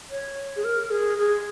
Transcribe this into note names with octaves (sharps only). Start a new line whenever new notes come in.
C#5
G#4
A#4
G#4
G#4